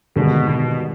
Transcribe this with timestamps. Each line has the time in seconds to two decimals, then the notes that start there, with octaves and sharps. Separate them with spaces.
0.16 G#1 G2 B2 D3 G#3
0.49 B2